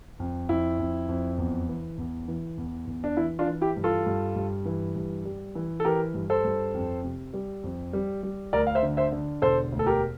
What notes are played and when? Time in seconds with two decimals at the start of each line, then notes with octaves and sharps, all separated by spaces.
0.20 F2
0.49 F2 E4
0.79 F2
1.09 F2
1.38 E2
1.68 E3
1.98 E2
2.28 E3
2.58 E2
2.87 E2
3.04 D4
3.17 E3 E4
3.39 D4 F4
3.47 E3
3.61 E4 G4
3.77 G2
3.84 F4 A4
4.06 G2
4.36 G2
4.65 E3
4.96 G2
5.25 G3
5.55 E3
5.80 A4
5.85 E3 G4 A#4
6.14 G2
6.30 A4 C5
6.44 G2
6.74 F2
7.04 C3
7.33 G3
7.64 F2
7.93 G3
8.23 G3
8.53 D2 A#4 D5
8.67 F5
8.75 C5 E5
8.83 D3
8.97 C5 E5
9.12 D3
9.42 E1 A4 C5
9.72 D2
9.79 A4
9.86 G4 A#4